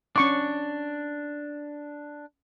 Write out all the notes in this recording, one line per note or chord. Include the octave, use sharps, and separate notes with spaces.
C#4 D4 C#6 D6